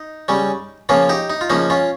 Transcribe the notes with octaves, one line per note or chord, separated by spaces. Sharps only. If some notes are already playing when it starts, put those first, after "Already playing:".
Already playing: D#4
C#3 G3 C#4
C#3 F3 A#3 C#4 F4
D#4 G4
D#4
F4
C#3 F3 A#3 C#4 D#4
C#4 F4